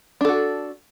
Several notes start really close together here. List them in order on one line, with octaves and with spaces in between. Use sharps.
D4 A4 F#4